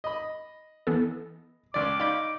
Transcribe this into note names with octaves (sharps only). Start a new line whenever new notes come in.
D#5 B5
E3 B3 A4
C#2 D5 D6
D#4 D5 F5 B5 G6